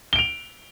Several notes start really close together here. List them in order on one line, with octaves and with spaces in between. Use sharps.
G7 D7 F7